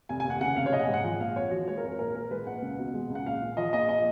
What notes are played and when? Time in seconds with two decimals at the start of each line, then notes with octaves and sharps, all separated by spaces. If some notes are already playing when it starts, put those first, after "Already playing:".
0.09 F1 G#5
0.20 D#2 G#5
0.30 F#5
0.41 C#3 F#5
0.56 F1 F5
0.66 C#5
0.72 A#1 D#5
0.80 F#5
0.83 G#2 G#5
0.94 F#5
1.04 F3 F#5
1.20 A#1 F5
1.36 F2 C#5
1.51 F3 F#4
1.68 G#3 C#5
1.77 A#4
1.83 F2
1.88 A#4
1.99 A#1 A#4
2.15 A#2 A#4
2.31 G#3 B4
2.47 A#1 F#5
2.62 C#2
2.78 B2
2.94 G#3
3.10 C#2
3.15 F#5
3.26 A#1 F5
3.42 A#2
3.57 F3 D#5
3.73 A#1 D#5
3.89 D#5